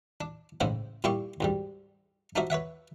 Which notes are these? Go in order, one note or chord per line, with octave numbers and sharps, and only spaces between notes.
D4
A1 G#2 C#3 E4 C5 G5
A#2 G3 E4 G4 C6 C#6
D2 G#2 G3
D4 D#4 F4 F#4 C5 E5
B4 C#5 E5 F#5